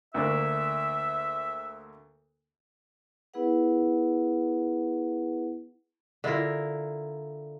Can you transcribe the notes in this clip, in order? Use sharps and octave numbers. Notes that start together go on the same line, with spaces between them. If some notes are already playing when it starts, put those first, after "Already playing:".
D2 A#3 D4 E5
B3 E4 G#4 B4 F#5
D3 E4 F4 A#4